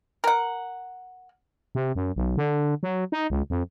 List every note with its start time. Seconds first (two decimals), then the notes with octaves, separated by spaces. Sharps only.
0.24 A#4 F#5
1.75 C3
1.95 F#2
2.16 B1
2.37 D3
2.83 F#3
3.12 D#4
3.30 C#2
3.50 F2